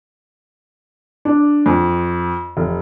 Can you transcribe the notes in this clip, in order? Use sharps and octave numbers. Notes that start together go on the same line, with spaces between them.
D4
F2
F1